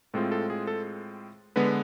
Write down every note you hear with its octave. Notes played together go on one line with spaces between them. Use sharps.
A2 G#3 C4 F4 A4
A4
G#4
A4
D3 G#3 B3 B4